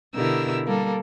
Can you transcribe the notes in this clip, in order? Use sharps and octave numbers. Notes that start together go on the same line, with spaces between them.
B2 D3 E4 G4 A#4 E6
G3 A#3 A4